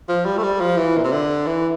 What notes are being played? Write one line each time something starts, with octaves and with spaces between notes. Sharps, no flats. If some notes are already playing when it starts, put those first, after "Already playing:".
F3
G3
A3
G3
F3
E3
A#2
C3
D3
E3